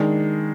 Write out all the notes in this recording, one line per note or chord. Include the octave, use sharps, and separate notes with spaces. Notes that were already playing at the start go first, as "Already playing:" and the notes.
Already playing: D#3 G#3 D4